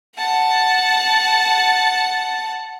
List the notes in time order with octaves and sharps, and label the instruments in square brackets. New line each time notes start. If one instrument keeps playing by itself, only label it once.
[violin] F#5 A5